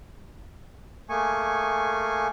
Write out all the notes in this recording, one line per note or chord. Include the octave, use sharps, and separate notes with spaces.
A3 A#3 G#4 G#5 C#6